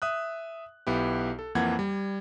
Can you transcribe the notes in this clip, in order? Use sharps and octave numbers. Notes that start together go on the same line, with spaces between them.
E5 D#6 F#6
B1 B3 E4 G4
A4
F2 E3 A#3 F#5 G#6
G3